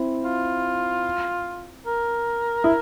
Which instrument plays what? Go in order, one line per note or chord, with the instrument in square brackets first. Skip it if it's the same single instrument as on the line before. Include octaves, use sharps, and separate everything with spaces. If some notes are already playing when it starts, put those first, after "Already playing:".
Already playing: [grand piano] C4 E4
[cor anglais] F4
A#4
[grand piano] E4